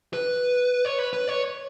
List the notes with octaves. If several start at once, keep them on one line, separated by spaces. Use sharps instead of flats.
B4
C#5
B4
B4
C#5